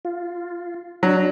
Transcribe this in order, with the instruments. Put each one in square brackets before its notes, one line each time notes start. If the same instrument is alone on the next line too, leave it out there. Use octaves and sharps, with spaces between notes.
[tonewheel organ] F4
[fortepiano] F#3 [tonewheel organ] D4 A#5